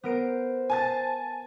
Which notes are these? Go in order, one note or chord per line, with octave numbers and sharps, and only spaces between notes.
B3 A#4 C5 D7
G#5 A5 A6